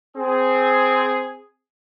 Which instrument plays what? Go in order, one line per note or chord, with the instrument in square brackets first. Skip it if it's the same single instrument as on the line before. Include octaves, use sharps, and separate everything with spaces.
[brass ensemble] C4 G#4